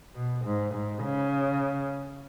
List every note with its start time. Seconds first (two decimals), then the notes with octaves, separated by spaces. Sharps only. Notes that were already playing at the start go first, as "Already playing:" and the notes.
0.16 B2
0.45 G#2
0.74 G#2
1.03 C#3